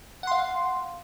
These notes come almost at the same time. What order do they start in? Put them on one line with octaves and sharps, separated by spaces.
F#5 C6 F5